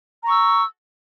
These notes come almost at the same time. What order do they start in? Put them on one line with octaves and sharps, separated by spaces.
A#5 C#6 E6